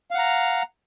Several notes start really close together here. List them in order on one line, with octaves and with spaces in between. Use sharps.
F5 F#5 A#5